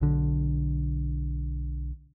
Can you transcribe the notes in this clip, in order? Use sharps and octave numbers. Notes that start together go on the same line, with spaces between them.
B1 D3